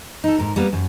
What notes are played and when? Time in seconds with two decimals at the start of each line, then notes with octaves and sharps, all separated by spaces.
0.24 D#4 A4
0.38 G#2 A#4
0.56 G3 A#3 B3
0.73 F#2